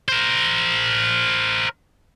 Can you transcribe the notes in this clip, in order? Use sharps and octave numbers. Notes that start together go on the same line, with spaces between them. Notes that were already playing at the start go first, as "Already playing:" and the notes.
A#4 C5